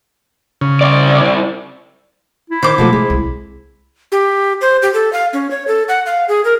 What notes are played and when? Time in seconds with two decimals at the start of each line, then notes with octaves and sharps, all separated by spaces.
0.61 C#3
0.81 C2 D5
2.50 E4
2.63 D#3 C5 D6
2.78 B2 F3 F#3 A3
2.93 F3 G#3
3.10 C2
4.12 G4
4.61 C5
4.82 G4
4.94 A4
5.13 F5
5.33 C#4
5.51 C#5
5.68 A4
5.89 F#5
6.06 F5
6.29 G#4
6.45 A#4